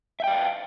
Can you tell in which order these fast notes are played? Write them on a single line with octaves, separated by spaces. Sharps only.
E5 G5 D5 F5